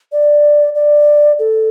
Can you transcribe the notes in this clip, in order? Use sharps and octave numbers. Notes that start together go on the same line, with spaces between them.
D5
D5
A4